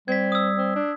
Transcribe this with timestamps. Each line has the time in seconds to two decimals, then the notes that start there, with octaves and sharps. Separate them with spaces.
0.08 G3 C4 G#6 B6
0.32 D#6 E6
0.58 C4
0.76 D4